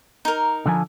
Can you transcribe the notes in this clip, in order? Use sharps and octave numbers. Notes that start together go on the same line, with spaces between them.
D#4 A#4
D3 F3 G#5